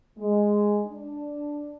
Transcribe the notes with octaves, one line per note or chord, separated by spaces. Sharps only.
G#3
D4